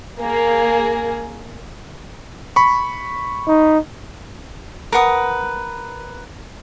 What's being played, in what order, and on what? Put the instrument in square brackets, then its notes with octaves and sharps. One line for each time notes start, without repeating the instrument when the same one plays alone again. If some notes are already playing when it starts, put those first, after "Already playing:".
[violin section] A#3 G#4
[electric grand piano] B5 C#6
[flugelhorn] D#4
[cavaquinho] A#4 B4 F#5 D#6